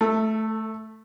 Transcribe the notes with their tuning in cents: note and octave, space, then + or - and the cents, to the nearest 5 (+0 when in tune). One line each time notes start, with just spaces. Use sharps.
A3 -5 A4 +25